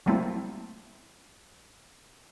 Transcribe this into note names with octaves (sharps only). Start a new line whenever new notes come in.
F#3 G3 A3 A#3 C4 E4